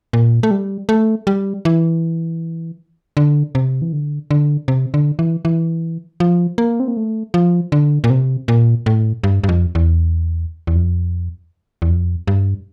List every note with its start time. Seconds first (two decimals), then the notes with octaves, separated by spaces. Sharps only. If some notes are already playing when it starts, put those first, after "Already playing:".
0.13 A#2
0.43 A3
0.51 G3
0.89 A3
1.27 G3
1.65 E3
3.17 D3
3.55 C3
3.82 E3
3.93 D3
4.31 D3
4.68 C3
4.94 D3
5.19 E3
5.45 E3
6.20 F3
6.58 A#3
6.80 C4
6.88 A#3
6.97 A3
7.34 F3
7.72 D3
8.04 A#2
8.10 C3
8.48 A#2
8.86 A2
9.23 G2
9.44 G2
9.49 F2
9.75 E2
10.67 E2
10.76 F2
11.82 E2
11.90 F2
12.27 G2